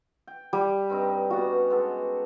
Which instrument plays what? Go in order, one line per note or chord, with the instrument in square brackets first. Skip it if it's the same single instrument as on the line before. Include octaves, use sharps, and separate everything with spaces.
[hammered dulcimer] G5
[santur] G3
[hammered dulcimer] G2 C4 D#4
[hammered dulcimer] B3 C#4 [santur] F#4
[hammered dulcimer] G#3 B3 A4